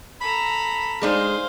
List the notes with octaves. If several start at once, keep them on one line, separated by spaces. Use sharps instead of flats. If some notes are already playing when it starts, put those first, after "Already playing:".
A4 A#5 B5
G#3 D4 D#4 G#4 C5 F5